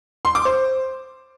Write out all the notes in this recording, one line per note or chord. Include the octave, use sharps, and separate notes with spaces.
C6
D6
C5